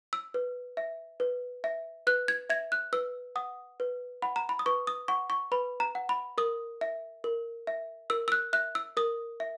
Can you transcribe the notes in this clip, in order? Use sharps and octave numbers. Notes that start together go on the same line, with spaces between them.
E6
B4
E5
B4
E5
B4 F#6
G#6
E5 G#6
F#6
B4 E6
F#5 D#6
B4
F#5 B5
A#5
B5
D#6
B4 C#6
D#6
F#5 C#6
C#6
B4 B5
A#5
F#5
B5
A#4 D#6
E5
A#4
E5
A#4 E6
E6
F#6
E5 F#6
E6
A#4 D#6
E5